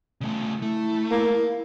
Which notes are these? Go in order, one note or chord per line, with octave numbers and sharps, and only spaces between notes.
C#3 A3
A3 E4
A#3